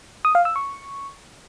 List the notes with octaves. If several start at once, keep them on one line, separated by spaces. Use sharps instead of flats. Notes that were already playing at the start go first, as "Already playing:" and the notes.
D#6
F5
E6
C#6